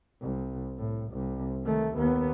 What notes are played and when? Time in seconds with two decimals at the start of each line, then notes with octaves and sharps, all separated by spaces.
0.22 C2
0.78 A2
1.12 C2
1.63 D#3 A3
1.94 D#2 B3